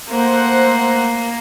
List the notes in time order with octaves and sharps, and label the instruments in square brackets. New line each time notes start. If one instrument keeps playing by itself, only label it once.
[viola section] A3 C5 F#5 [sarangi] A#3